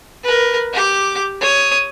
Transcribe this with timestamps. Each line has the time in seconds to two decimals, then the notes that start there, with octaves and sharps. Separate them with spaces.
0.23 A#4 B4
0.73 G4 D6
1.41 C#5 D#6